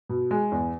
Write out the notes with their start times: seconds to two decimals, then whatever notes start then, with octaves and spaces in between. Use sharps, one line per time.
0.09 B2
0.31 G#3
0.52 E2